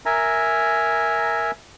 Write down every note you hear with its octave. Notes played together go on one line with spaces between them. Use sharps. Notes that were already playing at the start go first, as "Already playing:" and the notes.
A#4 E5 G#5 A#5